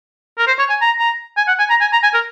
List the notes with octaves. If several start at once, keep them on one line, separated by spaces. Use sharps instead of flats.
A#4
C5
C#5
G#5
A#5
A#5
G#5
F#5
G#5
A#5
G#5
A#5
G#5
A#4